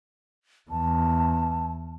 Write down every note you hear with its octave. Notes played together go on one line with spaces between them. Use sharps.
E2 A5